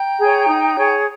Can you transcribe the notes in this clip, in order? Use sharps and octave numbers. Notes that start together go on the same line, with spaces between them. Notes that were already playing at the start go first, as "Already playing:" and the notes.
Already playing: G5 A#5
G#4 C#5
D#4
G#4 C#5